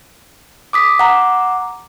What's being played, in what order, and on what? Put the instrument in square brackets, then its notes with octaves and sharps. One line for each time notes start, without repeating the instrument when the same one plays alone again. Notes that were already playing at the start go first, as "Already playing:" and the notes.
[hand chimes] D6 D#6 B6
F#5 A#5 D6